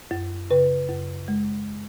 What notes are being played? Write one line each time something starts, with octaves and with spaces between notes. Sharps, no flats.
F#2
C#3 B4
F#2
G#3